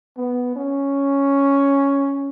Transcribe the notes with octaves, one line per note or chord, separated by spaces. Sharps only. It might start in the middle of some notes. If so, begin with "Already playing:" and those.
B3
C#4